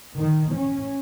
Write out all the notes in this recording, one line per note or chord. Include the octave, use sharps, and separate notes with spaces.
D#3
C#4